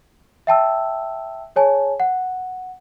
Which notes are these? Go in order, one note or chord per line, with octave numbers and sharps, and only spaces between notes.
E5 G5 A5 E6
G#4 C#5 G#5 A5
F#5